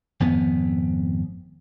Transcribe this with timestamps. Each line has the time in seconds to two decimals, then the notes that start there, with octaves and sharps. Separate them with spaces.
0.20 G#1 F2 B3